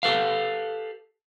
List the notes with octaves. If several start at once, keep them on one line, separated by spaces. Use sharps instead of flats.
G4 A4 B4 F5